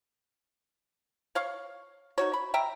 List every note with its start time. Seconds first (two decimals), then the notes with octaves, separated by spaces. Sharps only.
1.35 C#5 F5 C#6
2.18 D#4 F#4 C#5
2.33 B5
2.54 E5 G5 A#5